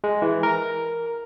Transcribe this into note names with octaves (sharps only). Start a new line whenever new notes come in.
G#3
E3
A#4